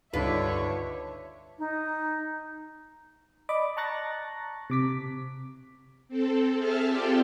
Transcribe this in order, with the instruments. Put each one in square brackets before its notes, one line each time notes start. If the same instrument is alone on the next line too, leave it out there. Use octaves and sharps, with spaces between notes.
[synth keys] C#2 G2 D#4 [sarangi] D3 [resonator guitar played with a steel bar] F4 B4 [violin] C#5 E5
[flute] D#4
[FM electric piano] D5 D#5 B5 D6
A5 A#5 C#6 F#6 A6 A#6
C3 D6 B6
[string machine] C4 A4
G#4 E5 A5 F6
C4 F4 G4 A4 D5 G5